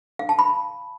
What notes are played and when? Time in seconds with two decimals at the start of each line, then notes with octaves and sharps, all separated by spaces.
0.19 F5
0.29 A5
0.39 B5